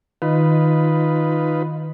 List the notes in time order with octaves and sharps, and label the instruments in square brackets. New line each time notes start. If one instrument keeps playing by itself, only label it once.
[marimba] D#3 [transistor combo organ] D#4 F4 B4